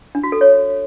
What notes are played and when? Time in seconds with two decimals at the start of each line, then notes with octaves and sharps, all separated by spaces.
0.15 D4
0.23 F#4
0.32 A4
0.41 C#5